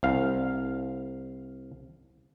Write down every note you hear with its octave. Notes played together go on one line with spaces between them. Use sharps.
C2 F5